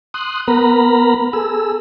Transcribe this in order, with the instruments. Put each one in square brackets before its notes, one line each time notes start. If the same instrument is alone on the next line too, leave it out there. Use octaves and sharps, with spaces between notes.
[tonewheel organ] C6 D#6 F#6
B3 A#4 A#5 B5
G#4 A4 E6